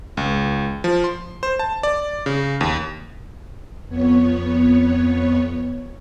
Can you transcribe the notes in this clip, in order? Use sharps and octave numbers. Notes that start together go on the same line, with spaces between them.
C#2
F3
C6
C5
A5
D5
C#3
D#2
F2 B3 C#5